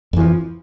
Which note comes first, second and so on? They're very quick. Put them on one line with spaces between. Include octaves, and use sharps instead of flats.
F2 E3 F3